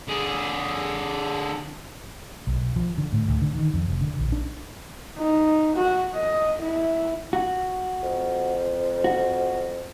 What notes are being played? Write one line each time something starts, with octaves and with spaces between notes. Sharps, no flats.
D3 G#4
B1
F3
D3
A2
D2
D3
D#3
F2
F1
D3
A#1
D4
D#4
F#4
D#5
E4
F#4
F2
F#4